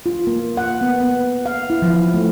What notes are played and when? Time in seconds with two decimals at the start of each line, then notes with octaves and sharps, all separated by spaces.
0.06 F4
0.27 A#3
0.57 F#5
0.81 B3
1.00 B3
1.46 F5
1.70 E4
1.82 F3
2.14 A3